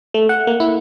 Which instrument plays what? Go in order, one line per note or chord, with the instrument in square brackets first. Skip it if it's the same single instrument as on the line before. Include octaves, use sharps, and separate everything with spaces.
[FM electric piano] A3
F#5
A#3
E4